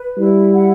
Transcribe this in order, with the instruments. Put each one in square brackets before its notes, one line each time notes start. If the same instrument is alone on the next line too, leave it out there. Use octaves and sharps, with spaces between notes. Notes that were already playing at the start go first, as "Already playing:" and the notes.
Already playing: [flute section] B4
[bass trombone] G3 [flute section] E4
[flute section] F#5